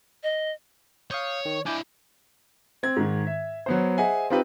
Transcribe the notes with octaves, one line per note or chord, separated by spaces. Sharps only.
D#5
C#5 F5 D#6 G6
D#3
D4 E4 G#5 D6 G6
C4 G#6
G#2 D#3
E5
F#3 B3 C5
G#4 C5 D#5 E5 F#5 G#5
C4 D#4 F4 G4 B4